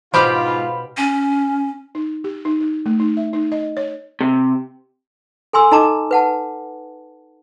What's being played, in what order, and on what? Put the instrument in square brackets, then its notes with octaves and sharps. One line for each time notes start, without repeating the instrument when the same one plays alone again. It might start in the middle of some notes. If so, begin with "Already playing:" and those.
[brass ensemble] G#2 F4 [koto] B2 G4 [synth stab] C5 F5 B5
[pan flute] C#4
[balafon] D#4
G4
D#4
D#4
A3
D#4
E5
D#4
D#5
C#5
[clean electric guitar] C3
[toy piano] A4 G#5 C6 E6
D#4 A4 D#5 A5 A#5 D6
B4 F#5 A5